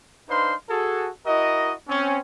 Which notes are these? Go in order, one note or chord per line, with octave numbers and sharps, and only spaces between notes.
D4 D#4 B4 C5 F5 C6
F#4 G#4 A4
E4 F#4 A#4 D#5
C4 C#4